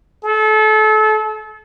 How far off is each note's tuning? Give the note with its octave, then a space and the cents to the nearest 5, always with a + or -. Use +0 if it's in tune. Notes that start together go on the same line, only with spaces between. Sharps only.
A4 -30